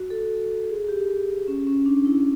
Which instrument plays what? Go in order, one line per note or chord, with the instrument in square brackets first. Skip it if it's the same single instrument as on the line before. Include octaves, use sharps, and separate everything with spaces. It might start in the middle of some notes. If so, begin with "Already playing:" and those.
Already playing: [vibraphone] F#4
A4
G#4
G4
C#4
C#4
D4
E4